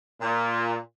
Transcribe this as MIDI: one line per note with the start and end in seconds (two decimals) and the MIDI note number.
0.21 0.76 46